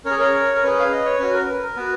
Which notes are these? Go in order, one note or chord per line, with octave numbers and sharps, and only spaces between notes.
C#4 A#4 C#5
G#4
A#4 C#5
A#4
C#4 G#4 B4
F5
D#5
C#5
C#4 F#4 B4
A#4
B4
A#4
B3 F#4 B4